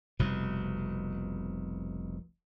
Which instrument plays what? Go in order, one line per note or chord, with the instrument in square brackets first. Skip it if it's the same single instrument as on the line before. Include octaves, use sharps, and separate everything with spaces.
[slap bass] F1 C2 B2